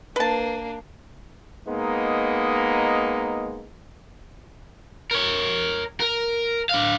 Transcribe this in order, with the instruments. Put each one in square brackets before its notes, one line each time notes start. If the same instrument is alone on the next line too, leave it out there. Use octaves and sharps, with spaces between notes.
[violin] A#3 D4 [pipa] B4 A5
[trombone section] G#3 A#3 B3 D#4
[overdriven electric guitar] A#4 C#5
A#4
D4 F5